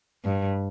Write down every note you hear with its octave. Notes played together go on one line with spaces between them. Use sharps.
G2